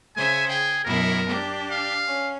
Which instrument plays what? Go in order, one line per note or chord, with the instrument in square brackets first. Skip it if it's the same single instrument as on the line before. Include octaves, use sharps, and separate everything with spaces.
[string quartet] C#3 C5 E5 [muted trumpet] G#5
[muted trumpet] G#4 [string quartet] G5
[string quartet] F#2 B2 E4 [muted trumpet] A#4
[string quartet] D4 G4
[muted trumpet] F5
[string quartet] C#4